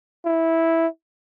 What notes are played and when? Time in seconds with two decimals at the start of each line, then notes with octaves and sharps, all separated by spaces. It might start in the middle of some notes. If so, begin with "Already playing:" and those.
0.25 E4